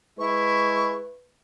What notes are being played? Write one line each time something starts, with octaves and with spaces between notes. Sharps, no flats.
G#3 E4 B4 C#6